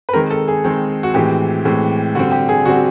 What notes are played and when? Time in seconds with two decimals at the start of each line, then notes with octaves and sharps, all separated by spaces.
0.09 B4
0.13 D#3 G#3 C4 A#4
0.31 A4
0.48 G#4
0.64 D#3 G#3 C4
1.03 F#4
1.14 A2 E3 G#3 C4 G4
1.65 A2 E3 G#3 C4
2.15 D3 G3 C4 F#4
2.32 G4
2.49 G#4
2.65 D3 G3 C4 F#4